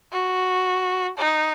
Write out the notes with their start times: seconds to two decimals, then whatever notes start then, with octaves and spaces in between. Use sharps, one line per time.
0.12 F#4
1.18 D#4